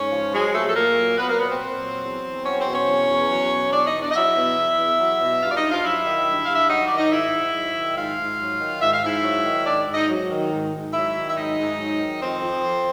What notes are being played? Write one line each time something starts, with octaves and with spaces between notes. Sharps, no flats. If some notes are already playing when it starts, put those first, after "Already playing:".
Already playing: G#2 C#4 C#5
F3
F#3 G#3 G#4
A#2 A3 A4
A4
A#2 A#3 A#4
F#3
F#3 B3 B4
A#3 A#4
A#2 B3 B4
C4 C5
A#2
F#3
E2
E2
F#3 C#4 C#5
C4 C5
B2
C#4 C#5
E2
E2
F#3
B2
E2 D4 D5
D#4 D#5
E2
D4 D5
D#5
F#3 E4 E5
B2
E2
E2
F#3
B2
G2 F4 F5
D5
D#4 D#5
G2
F4 F5
F#3 E4 E5
D#3
G2
F5
G2
E5
F#3 D#4 D#5
D#3 D5
D#4 D#5
G#2 E4 E5
G#2
F#3
D#3
G#2 F4 F5
G#2
F#3
D#3
G#2 E5
F5
G#2 E4 E5
F#3
D#3
G#2 D4 D5
G#2
D#4 D#5
F#3
D#3
G#2
G#2
F#3 E4 E5
D#3
E5
G#2 D#4 D#5
G#2
F#3
D#3
F2 C4 C5
F2
F3